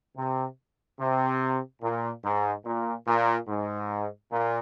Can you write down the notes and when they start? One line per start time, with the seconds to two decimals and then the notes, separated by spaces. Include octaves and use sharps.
0.17 C3
1.00 C3
1.82 A#2
2.24 G#2
2.65 A#2
3.06 A#2
3.48 G#2
4.31 A#2